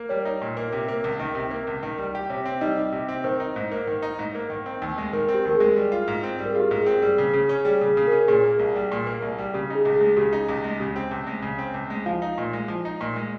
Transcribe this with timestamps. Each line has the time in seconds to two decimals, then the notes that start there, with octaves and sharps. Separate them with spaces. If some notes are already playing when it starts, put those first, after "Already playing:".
Already playing: A#3
0.09 G3 C#5
0.25 D#4
0.42 A#2
0.57 A#3
0.72 C3
0.88 A#3
1.04 C#2
1.20 D#3
1.35 C3
1.51 A#3
1.67 C#2
1.83 D#3
1.98 G3
2.15 G4
2.30 C3 C#5
2.45 C4
2.61 G3 D#4 D#5
2.77 G4
2.92 C3
3.08 C4
3.24 D#3 C5
3.40 D#4
3.56 G#2
3.72 A#3
3.87 D#3
4.02 D#4
4.19 G#2
4.35 A#3
4.50 D#3
4.66 C4
4.82 D#2
4.98 G#3
5.13 D#3 A#4
5.28 C4
5.34 G4
5.45 D#2 A#4
5.55 G#4
5.60 G#3
5.76 G3
5.92 F4
6.08 G#2
6.23 C4
6.39 G3
6.45 A#4
6.53 F4 G#4
6.60 G4
6.71 G#2
6.81 G#4
6.86 C4
7.02 G3 G#4
7.18 C#3
7.34 C#3 G#4
7.49 C#4
7.65 G3 G#4
7.81 C#3 G#4
7.97 C#3
8.07 C#4 A#4
8.28 A#2 G#4
8.44 A#3
8.59 C2
8.75 G3
8.92 A#2
9.07 A#3
9.22 C2
9.38 G3
9.54 C#3 G4
9.70 D#4 G#4
9.85 C#2
9.96 G#3 G#4
10.17 C#3 G4
10.33 D#4
10.49 C#2
10.64 G#3
10.80 C#3 G4
10.96 C4
11.11 C#2
11.27 G#3
11.42 C#3
11.59 C4
11.74 C#2
11.90 G#3
12.06 F3 F4 F5
12.22 D#4
12.38 A#2
12.53 G#3
12.68 F3
12.85 D#4
13.01 A#2
13.16 G#3